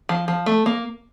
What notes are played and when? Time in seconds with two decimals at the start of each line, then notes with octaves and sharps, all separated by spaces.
0.09 F3
0.28 F3
0.46 A3
0.66 A#3